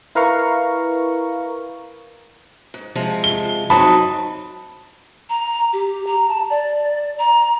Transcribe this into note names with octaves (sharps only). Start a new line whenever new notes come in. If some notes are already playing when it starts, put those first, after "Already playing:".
E4 A#4 B4 F5 A#5 C#6
G#2
C3 F3 G#3
G7
F#3 C4 D#4 A5 B5 D#6
A#5
G4
A#5
A5
D5
A#5